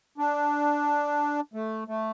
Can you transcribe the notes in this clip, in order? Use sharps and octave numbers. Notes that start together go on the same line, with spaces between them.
D4
A3
A3